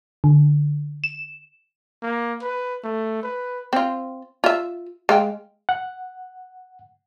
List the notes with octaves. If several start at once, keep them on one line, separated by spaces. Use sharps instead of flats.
D3
E7
A#3
B4
A3
B4
C4 F4
F4 E5
G#3 F5 G5
F#5